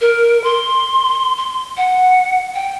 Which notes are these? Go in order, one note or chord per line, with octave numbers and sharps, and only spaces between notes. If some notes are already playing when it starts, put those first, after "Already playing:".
A#4
C6
C6
F#5
G5